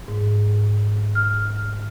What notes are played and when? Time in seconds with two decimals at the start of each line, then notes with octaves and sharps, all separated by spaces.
0.08 G#2
1.15 F6